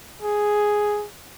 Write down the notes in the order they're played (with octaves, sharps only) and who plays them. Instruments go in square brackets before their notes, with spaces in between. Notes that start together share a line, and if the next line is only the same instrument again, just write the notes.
[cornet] G#4